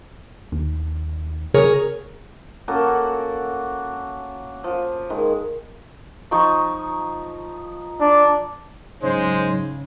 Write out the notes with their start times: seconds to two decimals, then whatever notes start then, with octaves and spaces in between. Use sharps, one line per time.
0.52 D#2
1.54 C#3 G#4 A#4 C#5
2.68 A#3 C#4 F#4 A4
2.84 F#5
4.64 F3
5.10 D#3 G#3
6.31 F3 D#4 C#6
8.00 D4
9.03 G#2 C#3 F#3 G#3 C5